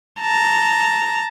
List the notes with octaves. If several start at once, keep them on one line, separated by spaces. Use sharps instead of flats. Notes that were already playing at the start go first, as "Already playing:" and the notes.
A5 A#5